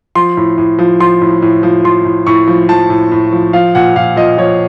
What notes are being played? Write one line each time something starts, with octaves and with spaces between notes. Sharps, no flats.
F3 C6
A2
A2
F3
F3 C6
A2
A2
F3
F3 C6
A2
A2 C#6
F3
F3 A5
A2
A2
F3
F3 F5
A#2 F#5
A#2 F5
F3 D#5
F3 C#5